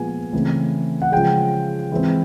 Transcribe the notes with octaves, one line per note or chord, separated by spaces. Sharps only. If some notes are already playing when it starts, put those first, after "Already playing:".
Already playing: A#2 F3 G#3 B3 G#5
C#3 E3 A3 C4
F#5
C#3 F3 G#3 G5
E3 G#3 C4